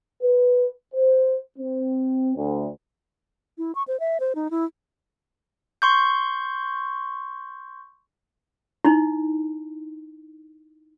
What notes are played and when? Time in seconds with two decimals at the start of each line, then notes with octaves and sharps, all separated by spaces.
0.22 B4
0.94 C5
1.59 C4
2.37 D2
3.58 E4
3.75 C#6
3.88 C5
4.00 E5
4.20 C5
4.35 D#4
4.51 E4
5.82 C6 C#6 G6
8.85 D#4 E4